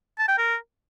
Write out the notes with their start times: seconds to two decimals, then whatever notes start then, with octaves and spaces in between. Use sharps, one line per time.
0.19 A5
0.28 G5
0.38 A#4